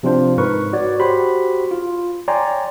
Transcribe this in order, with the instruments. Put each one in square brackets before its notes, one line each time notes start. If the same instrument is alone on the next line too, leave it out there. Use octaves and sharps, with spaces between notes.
[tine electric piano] C3 F3 C4 D4 F4 C5
G#2 A#4 B4 C#6
F#4 C#5 D5
F#4 G4 C5 B5 C6
F4
C#5 D5 G5 G#5 A#5 C6